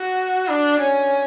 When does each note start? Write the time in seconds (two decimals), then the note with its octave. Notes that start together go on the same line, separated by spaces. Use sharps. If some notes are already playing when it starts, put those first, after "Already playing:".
Already playing: F#4
0.49 D4
0.80 C#4